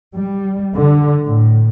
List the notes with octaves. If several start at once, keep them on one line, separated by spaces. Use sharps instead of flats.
G3
D3
A2